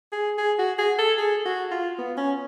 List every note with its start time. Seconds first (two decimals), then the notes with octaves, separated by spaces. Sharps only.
0.13 G#4
0.38 G#4
0.59 F#4
0.79 G#4
0.99 A4
1.18 G#4
1.45 F#4
1.71 F4
1.98 B3
2.18 C#4